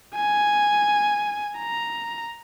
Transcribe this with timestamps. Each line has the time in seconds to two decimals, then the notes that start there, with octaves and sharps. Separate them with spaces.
0.16 G#5
1.58 A#5